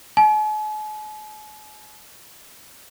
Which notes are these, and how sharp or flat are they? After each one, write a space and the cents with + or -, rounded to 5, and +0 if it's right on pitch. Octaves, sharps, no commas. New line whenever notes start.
G#5 +45